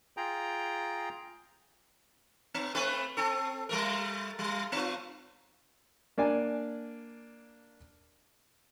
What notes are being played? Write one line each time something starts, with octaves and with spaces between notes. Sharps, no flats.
F4 G#4 G5 A#5
B3
A3 C4 B4
C4 A4
G3 A3 A#4
G3
B3 F4
A#3 D4 D5 G#5